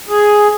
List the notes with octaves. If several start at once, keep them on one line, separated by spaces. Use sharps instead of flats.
G#4